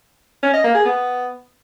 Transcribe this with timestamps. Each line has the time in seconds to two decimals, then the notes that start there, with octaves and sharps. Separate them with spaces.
0.43 C#4
0.54 D#5
0.64 A#3
0.75 G#4
0.85 B3